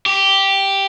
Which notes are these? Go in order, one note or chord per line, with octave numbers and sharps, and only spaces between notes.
G4